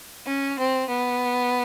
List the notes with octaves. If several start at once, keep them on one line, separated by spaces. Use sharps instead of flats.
C#4
C4
B3